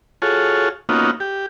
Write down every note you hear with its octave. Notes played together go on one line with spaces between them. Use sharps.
F4 F#4 G#4 A4 C#5
A#3 B3 C#4 D#4 F4 F#4
G4